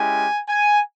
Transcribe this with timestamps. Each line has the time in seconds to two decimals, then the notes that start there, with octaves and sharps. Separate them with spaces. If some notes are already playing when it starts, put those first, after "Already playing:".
Already playing: G#3 C#4 E4 G4 G#5
0.48 G#5